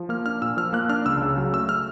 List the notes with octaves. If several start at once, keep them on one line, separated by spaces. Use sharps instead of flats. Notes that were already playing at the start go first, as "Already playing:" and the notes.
Already playing: F3
A#3 F6
D4 F6
A#2 E6
F3 F6
A#3 F#6
D4 F6
C#2 E6
C#3
F#3
A3 E6
F6